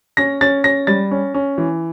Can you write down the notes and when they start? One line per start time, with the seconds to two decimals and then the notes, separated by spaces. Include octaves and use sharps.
0.17 C#4 A#6
0.41 C#4 A6
0.64 C#4 A#6
0.87 G3 A6
1.11 C#4
1.34 C#4
1.58 E3